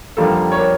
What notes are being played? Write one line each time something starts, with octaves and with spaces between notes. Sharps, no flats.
F2 D3 G3 A#3 F4 A4
C#5
G4 A#4